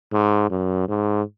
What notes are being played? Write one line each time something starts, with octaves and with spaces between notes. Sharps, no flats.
G#2
F#2
G#2